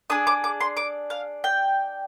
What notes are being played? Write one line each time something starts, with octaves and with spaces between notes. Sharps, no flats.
D4 G#4 D#6
D6
D6
C6
D6
F5
G5